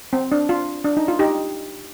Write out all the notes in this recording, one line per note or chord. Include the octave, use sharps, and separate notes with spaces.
C4
D4
F4
D4
D#4
F4
D#4 G4